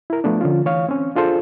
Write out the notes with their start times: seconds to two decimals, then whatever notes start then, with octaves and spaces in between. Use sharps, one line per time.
0.10 E4 A#4
0.24 F3 A3 B3 D4
0.41 D3 F3 C#4 F4
0.66 E3 C#5 F5
0.89 C4 C#4
1.16 D4 F4 G#4 A4 C5